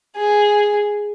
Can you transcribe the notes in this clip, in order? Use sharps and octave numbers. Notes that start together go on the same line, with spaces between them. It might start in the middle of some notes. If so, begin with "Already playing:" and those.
G#4